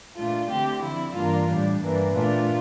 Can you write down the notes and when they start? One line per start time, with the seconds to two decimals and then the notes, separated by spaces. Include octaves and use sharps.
0.16 A#2 A3 D4 F4
0.48 D3 A3 C4 G4
0.81 D3 F3 C4 E4
1.14 G2 E3 A#3 D4 F4
1.48 A2 G3 D4
1.80 G2 E3 A#3 D4
2.13 A#2 A3 D4 F4